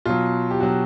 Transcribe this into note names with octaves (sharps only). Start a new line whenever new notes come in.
B2 F#3 F4
G4
B2 F#3 F#4